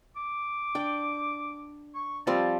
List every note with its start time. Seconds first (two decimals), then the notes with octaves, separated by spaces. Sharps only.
0.17 D6
0.75 D4 G5
1.95 C#6
2.27 F3 G3 C4 A5